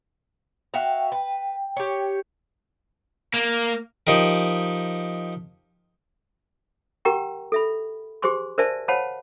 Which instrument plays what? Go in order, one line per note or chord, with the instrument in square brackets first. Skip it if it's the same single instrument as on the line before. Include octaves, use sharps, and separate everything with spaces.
[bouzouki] F#4 E5 F5 [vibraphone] G5
[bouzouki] B4
G4 C#5
[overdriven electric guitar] A#3
[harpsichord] F3 D#4 G4 A#4
[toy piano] G4 A#4 F#5 G5 A#5 C#6
A4 E5 B5
G4 G#4 C5 G#5 C6 C#6
A#4 C5 D5 E5 G#5 A5
C5 C#5 F5 F#5 A5 B5